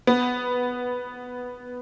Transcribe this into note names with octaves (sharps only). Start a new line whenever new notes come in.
B3